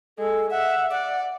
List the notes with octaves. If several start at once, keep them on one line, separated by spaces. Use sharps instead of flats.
G#3 A4
E5 F#5
D5 F#5